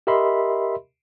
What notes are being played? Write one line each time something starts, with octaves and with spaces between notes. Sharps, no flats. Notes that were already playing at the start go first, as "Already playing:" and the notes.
G4 A#4 D#5 E5 B5 C6